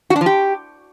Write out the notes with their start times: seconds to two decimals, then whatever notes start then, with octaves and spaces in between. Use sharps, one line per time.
0.10 F#4
0.16 D4
0.21 F3
0.26 G4